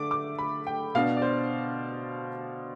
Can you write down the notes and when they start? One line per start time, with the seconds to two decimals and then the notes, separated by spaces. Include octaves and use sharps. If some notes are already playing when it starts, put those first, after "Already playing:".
Already playing: D3 A3 D4 D6
0.11 D6
0.39 B5
0.67 G5
0.95 B2 B3 D4 F5
1.17 D5
1.22 C5